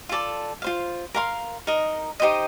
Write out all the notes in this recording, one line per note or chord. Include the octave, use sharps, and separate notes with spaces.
F4 A4 D5 A5
F4 C5 F5
A#4 F5 C6
D#4 A#4 D#5
D#4 G4 C5 D#5